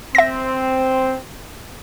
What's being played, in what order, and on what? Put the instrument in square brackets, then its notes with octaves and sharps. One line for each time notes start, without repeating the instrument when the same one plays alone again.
[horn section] C4 [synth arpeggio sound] E5 A#6